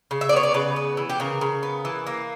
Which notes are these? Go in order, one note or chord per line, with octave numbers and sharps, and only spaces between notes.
C#3
E5
D5
B3 C#5
D5
C#3 B4
B3
E3
G4
C#3 A#4
C#3
B3
E3
A#3